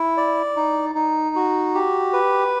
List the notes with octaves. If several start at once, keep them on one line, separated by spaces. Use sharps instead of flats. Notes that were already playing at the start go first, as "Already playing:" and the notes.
Already playing: E4
D5
D#4
D#4
F#4
G4
B4